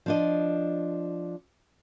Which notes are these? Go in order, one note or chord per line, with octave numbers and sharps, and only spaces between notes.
F3 D4 D#5